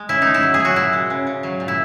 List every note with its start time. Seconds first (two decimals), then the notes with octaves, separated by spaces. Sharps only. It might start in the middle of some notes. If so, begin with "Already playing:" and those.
Already playing: G#3
0.09 C#3 E4
0.22 C#3 D#4
0.34 E4
0.43 F#3
0.54 G#4
0.60 F#3
0.65 F#4
0.76 A#2 E4
0.93 G#3
1.10 C#3
1.27 C#3
1.43 F#3
1.60 A#2
1.68 E4